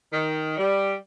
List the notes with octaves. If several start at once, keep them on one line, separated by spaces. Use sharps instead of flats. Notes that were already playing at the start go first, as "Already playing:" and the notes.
D#3
G3